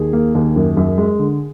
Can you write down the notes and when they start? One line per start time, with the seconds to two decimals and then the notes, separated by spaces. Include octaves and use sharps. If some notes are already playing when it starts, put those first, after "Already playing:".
Already playing: D#2 G#4
0.13 A#3
0.35 D#2
0.56 F#2
0.77 F#2
0.98 G#3
1.19 D3